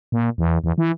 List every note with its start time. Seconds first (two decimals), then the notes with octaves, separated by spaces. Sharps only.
0.12 A#2
0.38 E2
0.64 E2
0.78 E3